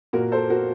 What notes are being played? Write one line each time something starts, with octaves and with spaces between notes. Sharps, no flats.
A#2 F#4 A#4
A4 C5
F#4 A#4